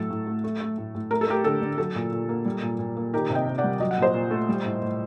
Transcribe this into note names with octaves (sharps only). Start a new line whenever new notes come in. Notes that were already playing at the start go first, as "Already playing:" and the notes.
Already playing: A2 F#3 A4
A2
A3
A3
A3
A2
A2
A3 A#4
A4
A3 G4 A#4
D3 A4
D3
F#3 A4
A#2
A#2
A#3
G3
A#2
A#2
A#3
D#3 G4 A#4
C3
D#5 G5
C3
D5 F#5
G3
F#3 D#5
F#5
A#2 C5 D#5
A#2
A3
G3
A2
A2